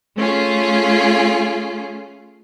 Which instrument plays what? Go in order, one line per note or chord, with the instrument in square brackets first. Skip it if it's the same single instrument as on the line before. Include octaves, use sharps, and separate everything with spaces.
[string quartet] A3 C#4 F4 G#4